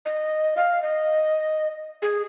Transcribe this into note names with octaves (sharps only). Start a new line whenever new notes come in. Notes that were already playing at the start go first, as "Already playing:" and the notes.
D#5
F5
D#5
G#4